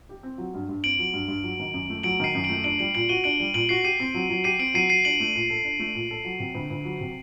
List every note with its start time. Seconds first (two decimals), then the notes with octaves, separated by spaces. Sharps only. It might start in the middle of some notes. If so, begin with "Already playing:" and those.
0.09 G4
0.23 C4
0.38 F#3
0.54 G2
0.69 G2
0.84 C4 D7 F#7
0.99 F#3
1.14 G2
1.28 G2
1.43 F#3
1.60 D#3
1.74 F#2
1.90 A3
2.03 F#3 D7 F#7
2.20 D#3 C7 D#7
2.35 F#2
2.44 D7 F#7
2.49 A3
2.64 D4 D7 F#7
2.79 G3 D7 F#7
2.95 A#2 D7 F#7
3.09 F#4 D#7 G7
3.24 D4 D7 F#7
3.40 G3
3.54 A#2 D7 F#7
3.69 F#4 C7 D#7
3.84 G4 C7 D#7
4.00 C4
4.14 F#3
4.29 F#3
4.44 G4 C7 D#7
4.59 C4 D7 F#7
4.74 F#3 C7 D#7
4.89 F#3 C7 D#7
5.05 D4 D7 F#7
5.20 A3
5.35 A#2
5.50 A4
5.65 D4
5.79 A3
5.95 A#2
6.11 A4
6.25 F#3
6.40 C3
6.55 D2
6.70 D2
6.85 F#3
7.01 C3